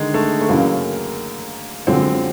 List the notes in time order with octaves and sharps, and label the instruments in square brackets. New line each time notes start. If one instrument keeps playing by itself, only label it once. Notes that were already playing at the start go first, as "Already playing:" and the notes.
Already playing: [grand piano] D3 D#3 G#3
A3
A3
[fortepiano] F#2 C#3 E3 [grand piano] A#3
[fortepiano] F#2 D3 F3 G#3 C#4 [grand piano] C4